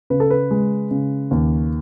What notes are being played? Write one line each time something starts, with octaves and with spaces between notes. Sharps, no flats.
C#3 B4
A4
B4
G#3
C#3
D#2